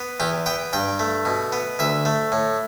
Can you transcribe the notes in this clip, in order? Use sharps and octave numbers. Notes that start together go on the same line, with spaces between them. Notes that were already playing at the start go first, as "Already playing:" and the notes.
Already playing: B3
E2 G4
B3 G5
G2 G5
A3
B2
B3
D2 E5
A3
A2